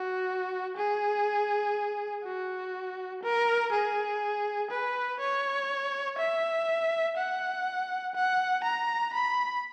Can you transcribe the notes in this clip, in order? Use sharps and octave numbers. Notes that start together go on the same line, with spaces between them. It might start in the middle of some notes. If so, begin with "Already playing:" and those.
Already playing: F#4
G#4
F#4
A#4
G#4
B4
C#5
E5
F#5
F#5
A#5
B5